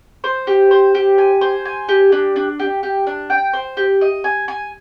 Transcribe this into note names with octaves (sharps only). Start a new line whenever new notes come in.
C5
G4
C5
G4
G#5
C5
G#5
G4
D4
D4
G4
G4
D4
G5
C5
G4
D#5
G#5
G#5